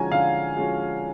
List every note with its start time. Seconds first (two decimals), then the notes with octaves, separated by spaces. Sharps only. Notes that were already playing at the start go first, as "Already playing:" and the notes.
Already playing: D3 F3 G#3 C#4 F#4 G#5 A#5
0.12 D3 F5
0.56 F3 G#3 C#4 F#4